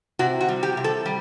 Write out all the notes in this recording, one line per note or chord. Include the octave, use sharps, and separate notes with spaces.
C3 F#4
F#4
G3
G4
C3
A4
G3